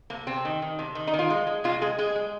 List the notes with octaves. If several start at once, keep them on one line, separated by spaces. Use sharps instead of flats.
C3 A#3
C3 C4
D#3
D#3
C3
D#3
D#4
D#3
F4
G#3
G#3
C3 F4
G#3 G#4
G#3 G#4
G#3